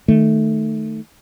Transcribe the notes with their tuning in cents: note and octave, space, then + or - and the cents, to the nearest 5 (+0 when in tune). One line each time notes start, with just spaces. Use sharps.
D#3 +0 A3 +0